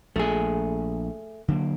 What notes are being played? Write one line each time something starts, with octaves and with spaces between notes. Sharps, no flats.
A#1 A3 G#4
D3 F#3 A#3